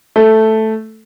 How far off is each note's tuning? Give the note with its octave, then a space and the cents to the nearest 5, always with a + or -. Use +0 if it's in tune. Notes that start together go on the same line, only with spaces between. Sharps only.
A3 +0